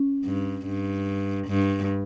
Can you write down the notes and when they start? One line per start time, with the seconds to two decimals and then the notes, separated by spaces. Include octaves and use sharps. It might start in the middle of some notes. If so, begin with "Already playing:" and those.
Already playing: C#4
0.25 G2
0.66 G2
1.47 G2